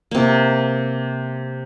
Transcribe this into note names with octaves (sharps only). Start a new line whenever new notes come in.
C3 A#3